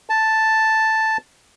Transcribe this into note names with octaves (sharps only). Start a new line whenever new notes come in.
A5